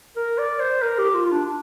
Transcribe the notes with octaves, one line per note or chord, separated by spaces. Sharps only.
A#4
D5
C5
A#4
G4
F4
F4
D4